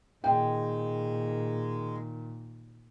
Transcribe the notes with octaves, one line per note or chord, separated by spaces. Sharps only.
A#2 D#3 G#3 G5